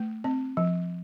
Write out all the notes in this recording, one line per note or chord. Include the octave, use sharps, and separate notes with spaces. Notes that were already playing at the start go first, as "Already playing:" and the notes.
Already playing: A3
C4
F3